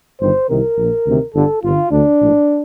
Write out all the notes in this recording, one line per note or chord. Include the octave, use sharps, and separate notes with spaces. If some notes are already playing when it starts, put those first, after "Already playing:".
G1 G2 D#3 C5
C2 C3 D#3 A#4
A#1 A#2
D2 C3 D#3
G1 G2 D3 A4
G1 G2 D3 F4
D2 D3 D4
A#1 A2